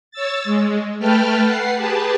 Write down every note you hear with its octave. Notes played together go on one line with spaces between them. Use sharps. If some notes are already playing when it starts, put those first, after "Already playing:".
C#5 E6 A6
G#3
A3 B4 G5 A5 F6
B4 F#5 C7
G4 G#4 B4 A5